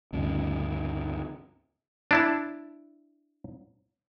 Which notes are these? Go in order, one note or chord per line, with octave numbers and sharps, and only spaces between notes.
D2 G2 C#3
D4 E4 A5